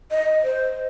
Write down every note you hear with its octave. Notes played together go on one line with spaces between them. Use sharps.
D#5
C5